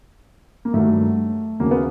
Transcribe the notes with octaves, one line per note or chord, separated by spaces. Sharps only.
A#3
G2 D#3 F#3 A3
D#2 C#3 F#3 A#3
B3